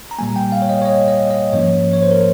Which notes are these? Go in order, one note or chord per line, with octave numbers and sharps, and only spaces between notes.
A#5
A#2 G3 A#3 G#5
G5
F5
C#5
D#5
C#5
D#5
D#5
D#5
G#2 F3 A#3 C#4 C#5
C#5
C5
A#4